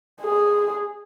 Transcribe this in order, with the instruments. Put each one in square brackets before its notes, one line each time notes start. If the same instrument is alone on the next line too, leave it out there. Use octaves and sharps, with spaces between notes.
[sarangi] G#4